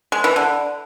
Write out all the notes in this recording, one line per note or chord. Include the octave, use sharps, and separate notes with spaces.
G#3
E3
D3